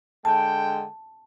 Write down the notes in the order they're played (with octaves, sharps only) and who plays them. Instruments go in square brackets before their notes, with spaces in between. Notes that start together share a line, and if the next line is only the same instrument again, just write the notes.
[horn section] D3 G#3 G5 [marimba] A5